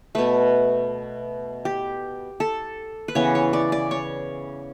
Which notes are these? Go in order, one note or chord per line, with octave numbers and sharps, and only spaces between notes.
B2 A3 B4
G4
A4
B4
C#3 E3 B3 C#5
C#5
D5
D5
C#5